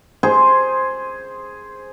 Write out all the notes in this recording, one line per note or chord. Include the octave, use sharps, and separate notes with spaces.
G#4 C5